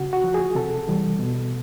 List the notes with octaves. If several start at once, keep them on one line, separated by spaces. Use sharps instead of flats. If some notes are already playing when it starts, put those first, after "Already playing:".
Already playing: C#3 F#4
F#4
F3
G#4
C3 A4
E3 G3
B2